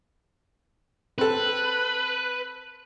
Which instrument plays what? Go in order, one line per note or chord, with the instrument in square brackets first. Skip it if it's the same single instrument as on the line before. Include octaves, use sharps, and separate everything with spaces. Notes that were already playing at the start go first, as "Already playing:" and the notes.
[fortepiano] C4 A4 [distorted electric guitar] B4